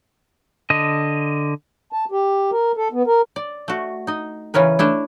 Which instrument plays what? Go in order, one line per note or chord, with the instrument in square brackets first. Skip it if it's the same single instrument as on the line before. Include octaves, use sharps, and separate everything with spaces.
[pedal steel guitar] D3 D#5
[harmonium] A5
G4
A#4
A4
B3
A#4
[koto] D5
A3 F#4
D#4 D#5
C#3 E3 C#4 A#4 B4
A3 D4 E4